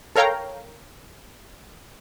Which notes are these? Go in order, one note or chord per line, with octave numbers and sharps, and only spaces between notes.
A4 A#4 C#5 F5 G5 A#5